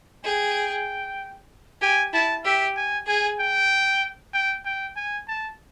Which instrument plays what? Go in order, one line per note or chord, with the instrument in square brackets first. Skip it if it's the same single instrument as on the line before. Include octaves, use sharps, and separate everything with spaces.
[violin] G#4 [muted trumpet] G5
[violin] G4 [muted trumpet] G#5
[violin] E4 [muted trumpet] A5
[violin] G4 [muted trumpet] E5
[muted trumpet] G#5
[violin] G#4 [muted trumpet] G#5
[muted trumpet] G5
G5
G5
G#5
A5